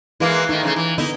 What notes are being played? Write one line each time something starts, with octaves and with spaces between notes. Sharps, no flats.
E3 G#3 A#3 E4 B4 F5
D#3 A3 D#4
C#3 F3 A3
E3
D3 B3 D#4 E4